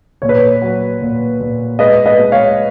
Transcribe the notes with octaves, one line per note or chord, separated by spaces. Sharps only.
A#2 C#5
B4
C#5
F#3
A#2
A#2
G#3 B4 D#5
B4 D#5
G#3
C#5 F5